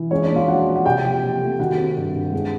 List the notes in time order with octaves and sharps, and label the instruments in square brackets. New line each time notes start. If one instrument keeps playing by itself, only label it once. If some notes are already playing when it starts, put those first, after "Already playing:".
Already playing: [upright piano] E3
G#3 C#4 C#5
D4 D5
A#2
F4 F5
F3 F#4 F#5
A#2
F#5
C3 G4 G5
F3
C3
A3
D#3 F#4 F#5
C4
G2
G2
G#3